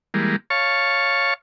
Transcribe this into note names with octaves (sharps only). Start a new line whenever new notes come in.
E3 G3 G#3 A#3
C#5 F5 A5 C#6